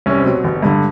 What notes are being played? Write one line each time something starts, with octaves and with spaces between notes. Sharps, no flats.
C2 C#4
C4
B2 F#3
G1
G2 D3